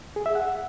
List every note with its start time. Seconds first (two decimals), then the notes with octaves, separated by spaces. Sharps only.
0.16 G#4
0.26 E5
0.35 F#5